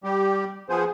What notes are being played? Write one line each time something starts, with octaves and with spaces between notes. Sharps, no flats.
G3 G4
F3 B3 G#4 C5